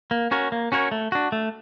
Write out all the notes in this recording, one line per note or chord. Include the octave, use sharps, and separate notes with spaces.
A#3
C#4 F#4 A#4 C#5
A#3
C#4 F#4 A#4 C#5
A3
D4 F#4
A3